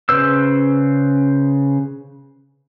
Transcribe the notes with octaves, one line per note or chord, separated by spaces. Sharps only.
C#3 B4 C5 E6